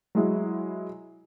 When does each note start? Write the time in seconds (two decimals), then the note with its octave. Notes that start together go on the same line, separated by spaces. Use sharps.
0.15 F#3 G#3 E4